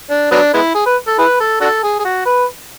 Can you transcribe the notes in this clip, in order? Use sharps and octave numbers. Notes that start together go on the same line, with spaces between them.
D4
F#3 B3 D4
G#3 B3 E4
G#4
B4
A4
E4 G#4 B4
A4
D4 F#4 A4
G#4
G#4
F#4
B4